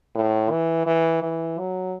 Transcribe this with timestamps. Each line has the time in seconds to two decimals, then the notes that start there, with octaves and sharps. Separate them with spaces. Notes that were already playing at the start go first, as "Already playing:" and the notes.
0.15 A2
0.51 E3
0.86 E3
1.23 E3
1.58 F#3